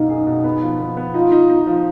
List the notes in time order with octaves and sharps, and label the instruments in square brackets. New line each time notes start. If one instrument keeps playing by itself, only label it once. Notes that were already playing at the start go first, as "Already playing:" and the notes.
Already playing: [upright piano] F#2 B2 A#3 [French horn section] D#4
[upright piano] G#4
B2
B3
F3
B3
B3
[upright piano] D#4 [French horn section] F4
[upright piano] D#4
D#4
F3